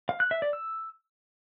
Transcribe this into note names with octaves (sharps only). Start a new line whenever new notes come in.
F5
F#6
E5
D5
E6